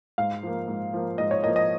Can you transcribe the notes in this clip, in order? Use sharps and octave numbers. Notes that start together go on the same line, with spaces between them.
G#2 F5
F3 A#3
G#2
F3 A#3
G#2 D#5
C#5
F3 A#3 D#5
D#5